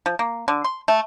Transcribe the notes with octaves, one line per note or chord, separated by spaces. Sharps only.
F3
A#3
D3
C6
A3